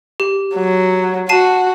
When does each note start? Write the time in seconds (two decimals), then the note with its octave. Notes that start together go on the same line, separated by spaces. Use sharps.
0.20 G4
0.56 F#3
1.29 F#4 A5 C7 D#7